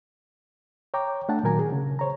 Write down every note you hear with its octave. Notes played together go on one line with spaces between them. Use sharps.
C#5 G5 A#5 D6
A3 D4 A4 F#5 G5 A5
A#2 D#3 F#3 A#4 G#5 A#5
G#4
C#3
C5 C#5 A#5